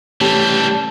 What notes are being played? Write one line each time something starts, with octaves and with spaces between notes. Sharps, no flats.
E3 G3 A3 C#4 G4 A5